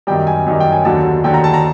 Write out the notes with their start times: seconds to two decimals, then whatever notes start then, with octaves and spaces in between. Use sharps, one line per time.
0.07 F#2 D#3 G3 G5
0.27 G#5
0.46 F#2 D#3 G3
0.60 G5
0.72 G#5
0.85 D#2 D3 F#3 A5
1.24 D#2 D3 F#3 G5
1.34 A#5
1.44 A5
1.54 A#5